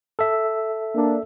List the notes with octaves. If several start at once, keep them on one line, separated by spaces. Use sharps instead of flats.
A4 E5
A#3 D4